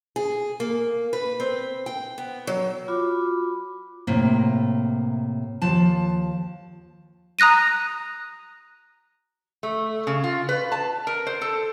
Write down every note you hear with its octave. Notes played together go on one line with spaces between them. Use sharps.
G#4
A#3
B4
C4
G5
B3
F#3
F4 F#4 B5 D6
A2 C3 A#3
D#2 F3 A5
A#5 D#6 F#6 A#6 D#7
A3
C#3
F4
B4
A5
A#4
C5
A4